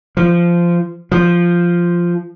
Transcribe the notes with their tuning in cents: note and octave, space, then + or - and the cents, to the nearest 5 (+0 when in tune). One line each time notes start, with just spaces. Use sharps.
F3 -15
F3 -5